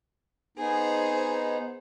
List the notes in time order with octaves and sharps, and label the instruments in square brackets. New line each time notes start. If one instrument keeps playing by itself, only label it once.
[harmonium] B3 D#4 [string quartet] G#4 C5